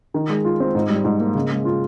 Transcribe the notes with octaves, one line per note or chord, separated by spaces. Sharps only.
D#3
G#3
F4
C4
G#2
G3
G#2
A#3
C#3
G#3
F4